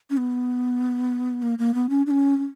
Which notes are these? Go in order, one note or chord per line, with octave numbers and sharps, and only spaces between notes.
C#4
B3
A#3
A#3
B3
C#4
D4
C#4
C#4